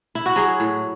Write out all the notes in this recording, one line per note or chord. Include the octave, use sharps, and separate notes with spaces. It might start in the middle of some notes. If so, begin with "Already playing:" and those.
E4
F#4
F#3 G#4
A2